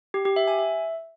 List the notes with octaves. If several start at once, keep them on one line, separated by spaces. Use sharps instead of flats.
G4
G4
E5
G#5
E5